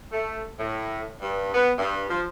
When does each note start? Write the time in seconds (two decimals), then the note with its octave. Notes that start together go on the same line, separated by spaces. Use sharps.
0.12 A3
0.59 A2
1.21 G2
1.54 B3
1.79 G2
2.09 F3